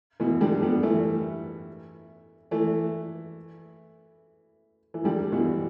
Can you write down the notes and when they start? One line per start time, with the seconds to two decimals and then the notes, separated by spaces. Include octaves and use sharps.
0.20 B2 E3
0.41 D3 G3
0.62 G3 B3
0.83 E3 A3
2.51 E3 A3
4.94 E3
5.04 D3 G3
5.32 B2 E3